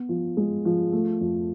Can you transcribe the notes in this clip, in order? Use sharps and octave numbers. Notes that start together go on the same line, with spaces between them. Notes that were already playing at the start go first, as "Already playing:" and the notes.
Already playing: B3
F3
G#3
F3
A3
F2